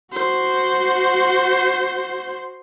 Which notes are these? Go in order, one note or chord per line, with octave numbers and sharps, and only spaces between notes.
F#4 C5